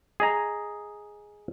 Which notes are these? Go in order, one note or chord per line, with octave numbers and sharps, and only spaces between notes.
G#4 D#5 A#5